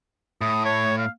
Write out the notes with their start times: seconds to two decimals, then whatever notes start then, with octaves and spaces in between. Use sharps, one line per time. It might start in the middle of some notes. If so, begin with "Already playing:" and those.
0.41 A2 D#6
0.65 C#5
0.98 F5